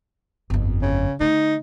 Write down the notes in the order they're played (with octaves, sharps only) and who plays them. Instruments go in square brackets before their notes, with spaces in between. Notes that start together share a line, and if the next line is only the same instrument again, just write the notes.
[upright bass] G1 F2
[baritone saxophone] C#3
[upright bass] D3 A3 [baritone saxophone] D#4